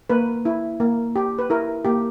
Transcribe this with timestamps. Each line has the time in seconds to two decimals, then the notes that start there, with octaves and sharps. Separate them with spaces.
0.10 A#3 B4
0.45 E4
0.80 A#3
1.16 G4
1.39 B4
1.50 E4 A#4
1.85 A#3 G4